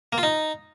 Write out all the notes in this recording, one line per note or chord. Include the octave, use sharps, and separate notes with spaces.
A#3
F4
D#4